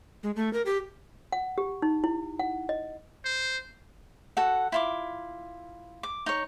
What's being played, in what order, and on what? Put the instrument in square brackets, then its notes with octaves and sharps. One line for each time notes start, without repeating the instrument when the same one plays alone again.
[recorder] G#3
A3
A#4
G4
[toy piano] F#5
G4
D#4
E4
F#5
D#5
[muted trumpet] C5
[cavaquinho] F#4 A4 F#5
E4 F4 D6
D6
D#4 C#5